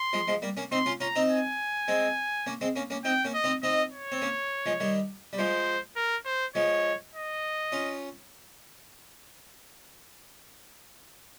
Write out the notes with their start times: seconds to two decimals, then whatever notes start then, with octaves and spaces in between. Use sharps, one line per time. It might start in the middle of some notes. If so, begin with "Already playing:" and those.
Already playing: C6
0.13 F3 G#3
0.28 F3 G#3
0.42 G3 A#3
0.57 A#3 C#4
0.72 C4 D#4 C6
0.86 C#4 F4
1.00 C#4 F4 A#5
1.16 C4 D#4
1.29 G#5
1.88 G#3 C4
2.46 A#3 C#4
2.61 G#3 C4
2.76 A#3 C#4
2.90 A#3 C#4
3.05 C4 D#4 G5
3.25 A#3 C#4
3.34 D#5
3.44 C4 D#4
3.63 C4 D#4 D#5
3.92 C#5
4.12 C4
4.22 A#3 C#4
4.66 F3 G#3
4.80 D#3 G3
5.33 G3
5.38 F3 G#3 C5
5.96 A#4
6.26 C5
6.55 F3 G#3 C#5
7.14 D#5
7.72 C#4 F4